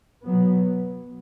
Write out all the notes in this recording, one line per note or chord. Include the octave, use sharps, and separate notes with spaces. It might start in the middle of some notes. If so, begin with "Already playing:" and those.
B2 F#3 B3